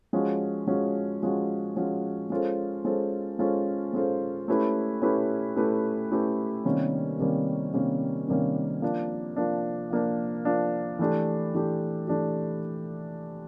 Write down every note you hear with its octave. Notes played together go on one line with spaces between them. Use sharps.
F3 G#3 C#4 F#4
F3 G#3 C#4 F#4
F3 G#3 C#4 F#4
F3 G#3 C#4 F#4
G#3 C#4 F4 A4 C5
G#3 C#4 F4 A4 C5
G#3 C#4 F4 A4 C5
G#3 C#4 F4 A4 C5
A3 C#4 E4 G4 B4
A3 C#4 E4 G4 B4
A3 C#4 E4 G4 B4
A3 C#4 E4 G4 B4
C3 D#3 G3 A#3 C#4
C3 D#3 G3 A#3 C#4
C3 D#3 G3 A#3 C#4
C3 D#3 G3 A#3 C#4
F3 A#3 D4
F3 A#3 D4
F3 A#3 D4
F3 A#3 D4
E3 A3 D4 G4
E3 A3 D4 G4
E3 A3 D4 G4